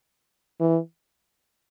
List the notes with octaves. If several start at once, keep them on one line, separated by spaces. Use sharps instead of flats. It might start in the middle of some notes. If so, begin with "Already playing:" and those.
E3